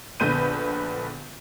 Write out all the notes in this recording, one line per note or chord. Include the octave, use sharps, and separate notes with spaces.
A#1 D3 B3 B4 G6 D#7